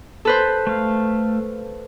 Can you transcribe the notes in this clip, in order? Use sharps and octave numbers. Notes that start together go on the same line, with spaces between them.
A4 B4 C5
A3 F5